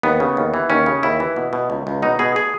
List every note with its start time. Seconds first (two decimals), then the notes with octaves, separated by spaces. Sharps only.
0.03 D#2 B3
0.20 C#3
0.37 D#2
0.54 E3
0.70 D#2 C#4
0.86 C#3
1.03 D#2 E4
1.20 E3
1.36 B2
1.53 B2
1.70 C#2
1.87 C#2
2.02 B2 D#4
2.19 B2 G#4
2.36 G#4